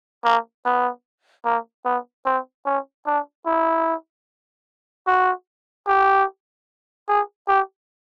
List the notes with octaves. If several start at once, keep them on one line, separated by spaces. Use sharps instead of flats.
A#3
B3
A#3
B3
C4
C#4
D4
E4
F#4
G4
G#4
G4